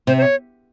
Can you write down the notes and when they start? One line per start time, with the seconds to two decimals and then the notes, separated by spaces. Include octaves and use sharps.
0.07 C3 C5
0.18 C5
0.22 C#5